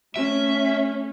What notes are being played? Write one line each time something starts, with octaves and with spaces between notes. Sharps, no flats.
A3 C#4 E5